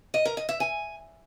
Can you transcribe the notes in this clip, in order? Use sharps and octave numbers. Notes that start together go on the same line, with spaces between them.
D#5
A#4
D#5
E5
G#5